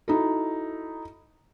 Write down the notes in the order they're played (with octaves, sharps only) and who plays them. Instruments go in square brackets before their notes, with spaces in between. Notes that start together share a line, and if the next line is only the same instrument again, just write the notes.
[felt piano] D#4 E4 F#4 A4